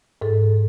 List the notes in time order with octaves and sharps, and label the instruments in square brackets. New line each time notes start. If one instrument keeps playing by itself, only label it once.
[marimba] G#2 A4